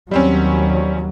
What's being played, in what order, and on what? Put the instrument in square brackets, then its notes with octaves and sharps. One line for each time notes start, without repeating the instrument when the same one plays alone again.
[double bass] D#2 F#3 [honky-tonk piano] G3 C4 C#4